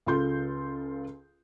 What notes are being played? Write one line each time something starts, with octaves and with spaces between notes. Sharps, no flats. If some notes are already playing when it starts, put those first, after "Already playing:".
C#2 C#3 F4 A4 C6 G6